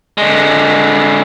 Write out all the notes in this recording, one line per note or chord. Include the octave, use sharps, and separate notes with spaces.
D3 G#3